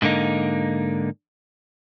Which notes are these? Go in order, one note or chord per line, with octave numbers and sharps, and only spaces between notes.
G#2 D3 A#3 D#4